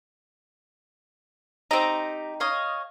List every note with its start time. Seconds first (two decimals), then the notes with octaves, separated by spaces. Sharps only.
1.71 C4 D#4 G4 A#5
2.40 C#5 D#5 F5